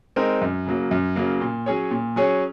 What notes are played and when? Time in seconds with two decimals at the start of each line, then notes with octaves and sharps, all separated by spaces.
0.16 G#3 C4 D#4 A#4
0.41 F#2
0.66 C#3 F#3 A#3
0.91 F#2
1.16 C#3 F#3 A#3
1.41 A#2
1.66 F#3 C#4 G#4 C#5
1.91 A#2
2.16 F#3 C#4 G#4 C#5